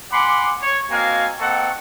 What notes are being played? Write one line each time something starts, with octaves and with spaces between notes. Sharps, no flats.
F#5 G#5 B5 C6 D6
C#5
A#3 C4 F#4 D#5 F5 G#5
A#3 C4 A4 D#5 F#5 C#6